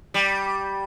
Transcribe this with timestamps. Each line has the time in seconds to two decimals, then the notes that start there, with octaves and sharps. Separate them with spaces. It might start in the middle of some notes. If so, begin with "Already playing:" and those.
0.14 G3